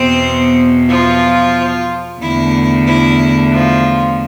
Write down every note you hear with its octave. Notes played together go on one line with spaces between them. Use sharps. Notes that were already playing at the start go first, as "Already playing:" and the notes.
Already playing: E2 B2 B3 C4 C5
F3 F4
E2 D3 A3 E4
E4
F3 F4